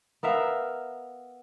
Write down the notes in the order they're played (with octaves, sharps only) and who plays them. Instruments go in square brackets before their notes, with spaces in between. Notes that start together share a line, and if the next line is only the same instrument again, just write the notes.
[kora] B3 A#4 E5 F5